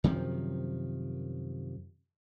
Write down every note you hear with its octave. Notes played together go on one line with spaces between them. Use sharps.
F#2 C3 D#3 F3